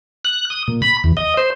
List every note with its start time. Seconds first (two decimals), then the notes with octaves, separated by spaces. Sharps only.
0.25 F#6
0.50 D#6
0.68 A#2
0.82 B5
1.04 E2
1.17 D#5
1.37 C5